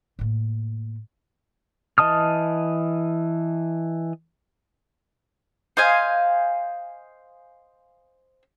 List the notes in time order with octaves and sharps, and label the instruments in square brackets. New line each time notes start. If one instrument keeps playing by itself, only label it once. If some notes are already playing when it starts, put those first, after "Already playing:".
[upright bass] A2 A#3
[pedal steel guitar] E3 D#5 A5 D#6 F6
[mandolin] C5 D#5 F5 G#5